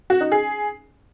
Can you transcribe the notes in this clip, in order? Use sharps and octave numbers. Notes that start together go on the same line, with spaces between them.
F#4
D#4
G#4